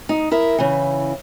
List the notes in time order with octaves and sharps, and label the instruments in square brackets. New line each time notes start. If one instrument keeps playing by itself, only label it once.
[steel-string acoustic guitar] D#4
E4 A#4 E5
C#3 E3